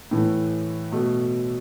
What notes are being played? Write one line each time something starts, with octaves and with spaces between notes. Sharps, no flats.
A2 E3 A3
B2 A3